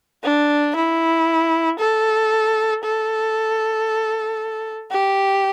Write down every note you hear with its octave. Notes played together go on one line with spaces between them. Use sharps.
D4
E4
A4
A4
G4